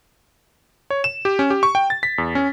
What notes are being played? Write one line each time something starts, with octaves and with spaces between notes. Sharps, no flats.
C#5
E7
G4
C#4
G4
C#6
G5
A6
B6
E2
C#4